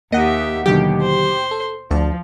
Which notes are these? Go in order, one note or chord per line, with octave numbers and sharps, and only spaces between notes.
D#2 A#3 G4 D#5 E5 F#5
D#2 B2 D3 D#3 F#3 G4
C5
A4
D2 F3 D5 A5